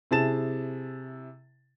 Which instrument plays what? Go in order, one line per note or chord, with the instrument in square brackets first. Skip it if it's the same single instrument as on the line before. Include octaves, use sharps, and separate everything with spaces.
[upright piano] C3 E4 G#4 A5 A6 E7